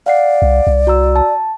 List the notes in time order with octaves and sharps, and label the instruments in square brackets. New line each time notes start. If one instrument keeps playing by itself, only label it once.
[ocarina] D5 [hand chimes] F5 F#5 C7
[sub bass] C2
C2
[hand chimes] F#4 A#5 E6
A5